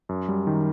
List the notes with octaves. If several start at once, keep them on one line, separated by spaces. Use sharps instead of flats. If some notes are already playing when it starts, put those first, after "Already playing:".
F#2
G3
D#3